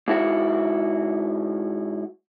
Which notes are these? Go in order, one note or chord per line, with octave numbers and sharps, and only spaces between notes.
G#2 E4 F#4